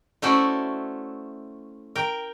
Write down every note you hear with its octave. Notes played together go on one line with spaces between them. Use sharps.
A3 C#4 E4 F#4 C5 D5
A#4 G5